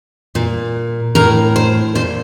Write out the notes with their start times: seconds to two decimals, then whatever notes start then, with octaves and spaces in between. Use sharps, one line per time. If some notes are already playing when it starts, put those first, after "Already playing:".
0.35 A#2
1.15 A2 A#4
1.56 C5
1.95 A#2 C5